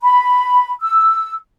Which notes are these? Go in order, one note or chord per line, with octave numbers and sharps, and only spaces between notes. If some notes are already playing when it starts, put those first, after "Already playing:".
B5
E6